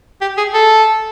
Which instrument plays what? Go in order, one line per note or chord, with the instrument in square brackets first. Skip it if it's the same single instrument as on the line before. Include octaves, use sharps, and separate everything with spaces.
[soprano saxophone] G4
G#4
A4